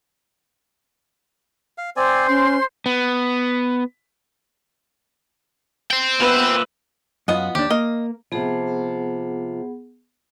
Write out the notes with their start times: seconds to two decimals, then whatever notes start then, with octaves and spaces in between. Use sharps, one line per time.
1.78 F5
1.96 C4 C5 D5 G#5
2.28 C#4 C6
2.86 B3
5.91 C5 G5
6.20 A#2 B3 B4 E5
7.28 F#2 B3 F4 D#5 F#5
7.55 D#2 D4 G4
7.70 A#3 D#5
8.32 C3 F3 B3 G#4 F#5